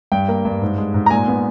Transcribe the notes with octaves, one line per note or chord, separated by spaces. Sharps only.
G2 G5
A#3
G2
G#2
G#3
G#2
A#5
A#2 G#5
B3